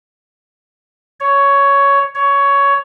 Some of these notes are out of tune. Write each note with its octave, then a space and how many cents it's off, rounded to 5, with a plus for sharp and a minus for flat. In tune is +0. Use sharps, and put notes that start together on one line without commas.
C#5 +10
C#5 +15